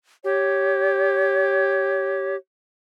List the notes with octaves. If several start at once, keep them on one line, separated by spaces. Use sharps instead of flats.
G4 C#5